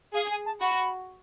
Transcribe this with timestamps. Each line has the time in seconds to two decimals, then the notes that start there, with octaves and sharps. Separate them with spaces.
0.14 G#4 F5
0.31 G#5
0.45 A5
0.61 F#4 B5